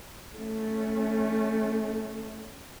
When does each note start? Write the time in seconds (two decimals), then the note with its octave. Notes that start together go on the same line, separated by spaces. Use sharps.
0.37 A3 C#4